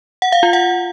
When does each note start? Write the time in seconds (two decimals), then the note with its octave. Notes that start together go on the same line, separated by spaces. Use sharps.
0.22 F#5
0.32 F5
0.43 F4
0.53 F#5